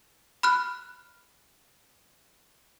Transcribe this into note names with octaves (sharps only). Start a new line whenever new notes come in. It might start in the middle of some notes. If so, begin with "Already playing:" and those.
B5 F6 F#6